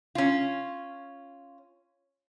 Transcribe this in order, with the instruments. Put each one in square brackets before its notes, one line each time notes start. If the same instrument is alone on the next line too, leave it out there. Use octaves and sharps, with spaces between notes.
[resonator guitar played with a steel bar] C#4 F4